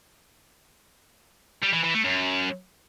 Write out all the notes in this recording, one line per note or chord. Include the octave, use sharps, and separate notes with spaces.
G3
E3
E3
A3
F#2